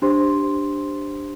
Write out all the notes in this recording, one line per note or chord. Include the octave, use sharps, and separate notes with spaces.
D4 G4 C5 C6